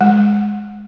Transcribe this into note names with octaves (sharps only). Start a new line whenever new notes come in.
G#3